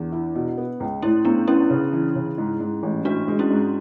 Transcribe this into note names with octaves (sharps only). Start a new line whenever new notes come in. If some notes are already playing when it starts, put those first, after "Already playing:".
Already playing: E2 D4
E4
B2
B3
C#2
A2 C#4 E4
A2 B3 D4
B3 C#4 E4
C#3
E3
C#3
G#2
G#2
A1
A1 D4 F#4
G#3
C#4 E4
G#2